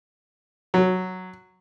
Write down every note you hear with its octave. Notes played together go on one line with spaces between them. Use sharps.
F#3